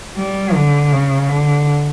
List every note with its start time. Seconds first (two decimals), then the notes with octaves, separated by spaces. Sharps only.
0.17 G3
0.54 D3
0.92 C#3
1.28 D3